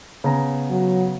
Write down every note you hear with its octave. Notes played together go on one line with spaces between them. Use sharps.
C#3 B3 A#5
F#3